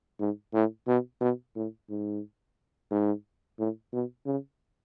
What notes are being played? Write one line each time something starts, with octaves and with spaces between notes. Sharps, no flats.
G#2
A2
B2
B2
A2
G#2
G#2
A2
B2
C#3